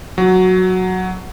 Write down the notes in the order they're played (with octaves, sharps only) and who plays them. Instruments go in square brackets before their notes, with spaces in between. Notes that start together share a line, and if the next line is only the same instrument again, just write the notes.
[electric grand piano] F#3